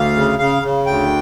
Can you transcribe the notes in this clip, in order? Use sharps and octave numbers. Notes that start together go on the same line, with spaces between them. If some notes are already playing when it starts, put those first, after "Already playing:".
Already playing: D2 F5
C#3
C#3 F5
C#3
D2 G5